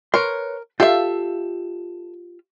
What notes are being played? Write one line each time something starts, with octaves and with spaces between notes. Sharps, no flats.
A#4 B4 C#5 C6
F4 G4 A4 E5 F5